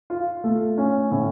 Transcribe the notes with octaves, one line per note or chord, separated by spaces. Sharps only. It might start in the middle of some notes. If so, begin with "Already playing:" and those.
F4
A3
C#4
A2